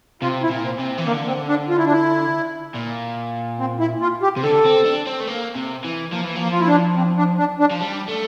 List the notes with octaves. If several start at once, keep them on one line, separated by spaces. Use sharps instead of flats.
C3 F4
E4
A#2
C4
C3
E3
D3 A#3
C4
D4
F4
E4
D4
E4
A#2
C4
E4
F4
G4
C3
D3 A4
C4
D4
C4
A3
A#3
C3
E3
F3 A#3
E3
F3 A#3
F4
E4
D4
C4
D4
D4
D4
F3
G3
A3